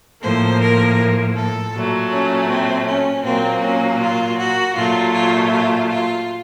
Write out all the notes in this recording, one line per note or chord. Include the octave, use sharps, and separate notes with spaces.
A2 F3 A#3 C5
A#4
A4
A#2 F#3 A3
C#4
C4
C#4
A#2 F#3 A#3 C4
C#4
F4
F#4
A#2 F#3 A3 F4
F4
F4
F4